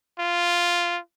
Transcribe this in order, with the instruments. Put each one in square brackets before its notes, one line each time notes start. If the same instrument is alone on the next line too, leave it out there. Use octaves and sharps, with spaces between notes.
[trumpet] F4